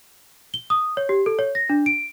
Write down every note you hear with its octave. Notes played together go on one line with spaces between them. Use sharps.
G7
D#6
C#5
G4
A4
C#5
A#6
D4
D7